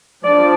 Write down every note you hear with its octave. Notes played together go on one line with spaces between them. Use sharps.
F3 D4 D5